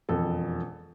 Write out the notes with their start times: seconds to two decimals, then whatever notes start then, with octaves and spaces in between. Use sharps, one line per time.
0.09 E1 F2 A4